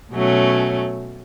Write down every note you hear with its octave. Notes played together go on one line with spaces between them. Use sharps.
B2 F#3 A3 C#4